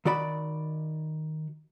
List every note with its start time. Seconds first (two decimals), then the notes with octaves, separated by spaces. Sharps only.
0.05 D#3 F#4 D5 B5